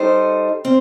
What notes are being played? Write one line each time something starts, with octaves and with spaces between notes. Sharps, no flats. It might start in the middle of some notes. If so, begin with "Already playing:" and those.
Already playing: G3 D#4 A4 C5
C4